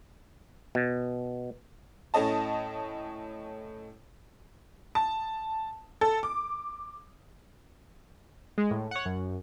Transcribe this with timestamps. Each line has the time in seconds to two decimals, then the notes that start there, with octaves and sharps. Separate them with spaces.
0.75 B2
2.14 A2 A3 C#4 D#5 A5
4.95 A5
6.01 A4
6.23 D6
8.58 G#3
8.71 A2
8.91 C#5 F#5
9.05 F#2